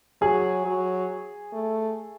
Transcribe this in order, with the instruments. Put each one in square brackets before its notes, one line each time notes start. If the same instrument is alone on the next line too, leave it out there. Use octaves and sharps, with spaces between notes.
[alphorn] F#3 [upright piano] G#4
[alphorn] F#3
A3